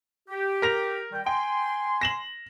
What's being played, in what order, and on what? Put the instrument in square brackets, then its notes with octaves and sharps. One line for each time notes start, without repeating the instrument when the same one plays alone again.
[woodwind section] G4
[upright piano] A#4 A#6 F7
[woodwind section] D#3 G3 G5
[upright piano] G5 [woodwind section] G#5 C6
[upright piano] A#6 E7 F#7